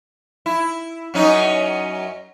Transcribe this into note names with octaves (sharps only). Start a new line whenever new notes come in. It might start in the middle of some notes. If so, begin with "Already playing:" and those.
E4
F#2 C#4 D#4